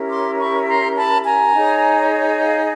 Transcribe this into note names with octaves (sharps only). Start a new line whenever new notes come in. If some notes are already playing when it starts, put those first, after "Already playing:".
Already playing: C#4 E4 G4 A#4
C6 D6
B5 C#6
A#5 C6
A5 B5
G#5 A#5
D#4 G#4 C#5
D#5 F5